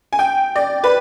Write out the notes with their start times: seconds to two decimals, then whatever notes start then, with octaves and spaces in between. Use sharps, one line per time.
0.13 G#5
0.19 G5
0.56 D5
0.84 B4